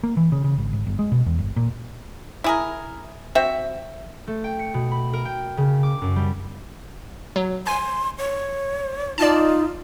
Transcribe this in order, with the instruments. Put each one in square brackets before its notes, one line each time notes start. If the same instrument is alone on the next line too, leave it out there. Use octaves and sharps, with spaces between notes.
[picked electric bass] A#3
E3
C#3
C#3
G#1
G#1
G1
G#3
B2
E2
G1
A#2
[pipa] E4 G#4 A#4
[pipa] C4 F#4 [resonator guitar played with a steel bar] E5
[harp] A3
G5
C#7
B2
B5
A#4
G5
C#3
D6
F#2
G3
[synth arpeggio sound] F#3
[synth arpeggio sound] G#5 [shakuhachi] C6
[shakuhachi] C#5
[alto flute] D#4 [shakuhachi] F4 [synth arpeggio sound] D5 A5